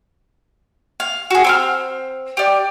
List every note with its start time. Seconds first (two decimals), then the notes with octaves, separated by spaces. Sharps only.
1.00 F5
1.31 F#4 G#4
1.44 C4 B5 F6
2.37 G4 D5